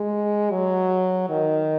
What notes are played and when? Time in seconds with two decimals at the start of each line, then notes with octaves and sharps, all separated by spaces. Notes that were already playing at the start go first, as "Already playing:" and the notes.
Already playing: G#3
0.51 F#3
1.30 D#3